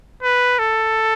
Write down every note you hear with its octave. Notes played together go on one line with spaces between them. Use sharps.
B4
A4